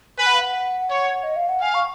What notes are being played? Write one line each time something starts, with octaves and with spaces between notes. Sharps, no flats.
B4 G#5
F#5
F5
F#5
C#5
D#5
F5
F#5
F5 G#5
C#6